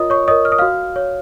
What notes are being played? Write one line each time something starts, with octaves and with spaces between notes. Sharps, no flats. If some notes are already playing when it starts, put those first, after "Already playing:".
Already playing: F4 A#4 C#5 D#5 D#6
C#5 C#6
A#4 C#5 D#5 D#6
F6
D#6
F#4 F5 F6
C#5